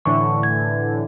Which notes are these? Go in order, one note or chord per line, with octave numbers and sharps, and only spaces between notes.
A2 D3 E3 C#6
G#6